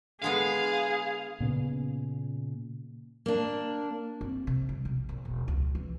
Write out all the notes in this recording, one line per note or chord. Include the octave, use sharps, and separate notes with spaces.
D3 G#3 B3 G#4 F5
A#2 C#3 B3
A#3 D4
C4
C3
G3
B1
A#1
E1
C#2
E3